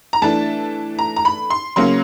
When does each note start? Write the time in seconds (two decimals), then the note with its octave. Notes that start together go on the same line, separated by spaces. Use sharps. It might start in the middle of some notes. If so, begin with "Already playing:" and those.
0.13 A#5
0.22 E3 A3 D4 A5
0.99 A#5
1.16 A#5
1.25 B5
1.50 C6
1.76 C#3 F#3 A#3 C#4 C6